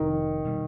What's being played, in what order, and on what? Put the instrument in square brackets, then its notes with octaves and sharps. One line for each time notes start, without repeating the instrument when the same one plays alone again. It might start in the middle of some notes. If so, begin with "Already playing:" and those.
Already playing: [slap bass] F1 F2 C3 [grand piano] D#3
[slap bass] B2 G3